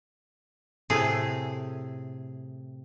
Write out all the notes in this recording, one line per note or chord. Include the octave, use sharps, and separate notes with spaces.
A2 C3 G#4